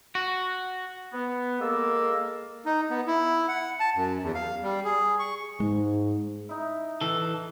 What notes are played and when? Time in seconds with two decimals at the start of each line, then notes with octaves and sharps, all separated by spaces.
0.15 F#4
1.13 B3
1.61 G#3 A#3 A4 E6
2.65 D#4
2.90 B3
3.07 E4
3.48 F#5
3.80 A5
3.96 F#2
4.23 E2
4.35 F5
4.63 G3
4.84 G#4
5.19 C#6
5.60 G#2 G#3
6.49 D#4 E4
7.01 E3 A4